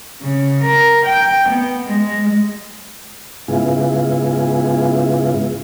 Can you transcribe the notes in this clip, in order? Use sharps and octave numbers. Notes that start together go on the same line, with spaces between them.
C#3
A#4
G5
B3
G#3
G#2 C#3 B3 E4 F4 G#4